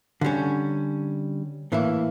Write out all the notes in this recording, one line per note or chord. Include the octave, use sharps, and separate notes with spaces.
D3 G3 C#4
A2 E3 A#3 E4